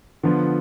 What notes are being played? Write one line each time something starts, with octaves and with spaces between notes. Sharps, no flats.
D3 F3 B3 F4